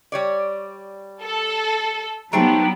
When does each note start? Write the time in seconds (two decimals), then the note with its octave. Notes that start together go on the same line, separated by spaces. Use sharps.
0.12 G3 C#5 D5
1.23 A4
2.33 F#3 G3 A3 B3 D#4 G#4 C5 G5